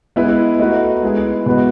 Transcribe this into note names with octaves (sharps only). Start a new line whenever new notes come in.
G#3 B3 E4 B4
A3 D#4 F#4 B4
G#3 B3 E4 G#4 B4
B2 G#3 B3 F#4 B4